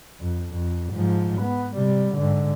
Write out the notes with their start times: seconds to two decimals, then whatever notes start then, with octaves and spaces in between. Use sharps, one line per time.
0.21 F2
0.54 F2
0.93 G#2 F3
1.41 B3
1.76 C3 G3
2.14 G#2 D3